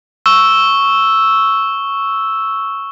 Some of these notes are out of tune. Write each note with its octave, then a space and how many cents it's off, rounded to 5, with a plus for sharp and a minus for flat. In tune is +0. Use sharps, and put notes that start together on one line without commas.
C#6 +0 E6 +0